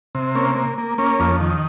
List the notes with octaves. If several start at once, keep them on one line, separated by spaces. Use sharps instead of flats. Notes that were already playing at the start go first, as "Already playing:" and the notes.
C3
A#3 C#4
A#3
A#3
A#3 C#4
F2
D#3